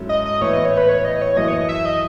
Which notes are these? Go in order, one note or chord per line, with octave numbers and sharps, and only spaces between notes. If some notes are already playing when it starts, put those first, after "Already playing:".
Already playing: G#2 F#3 C#4 E4 A4
D#5
D#5
A2 E3 B3 E4 C#5
D#5
C#5
B4
C#5
D#5
C#5
F#2 E3 A3 D#5
C#5
D#5
E5
D#5